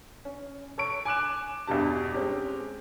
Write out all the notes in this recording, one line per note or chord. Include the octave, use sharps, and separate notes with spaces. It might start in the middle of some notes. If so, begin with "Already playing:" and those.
C#4
A4 C#5 C#6 D7
G#5 D6 F#6 E7
E2 G2 B2 G4 A5
G#3 C4 C#4 G4